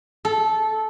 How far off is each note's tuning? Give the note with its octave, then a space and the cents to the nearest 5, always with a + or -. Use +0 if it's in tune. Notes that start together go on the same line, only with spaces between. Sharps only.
A4 -15